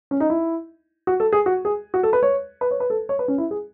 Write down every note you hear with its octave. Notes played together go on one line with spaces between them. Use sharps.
C#4
D#4
E4
F#4
A4
G#4
F#4
G#4
F#4
A4
B4
C#5
B4
C#5
B4
A4
C#5
B4
C#4
E4
G#4